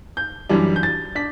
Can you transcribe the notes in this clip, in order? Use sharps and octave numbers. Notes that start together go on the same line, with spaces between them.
G6
F#2 E3 G3 D4
G6
A6
D4 B6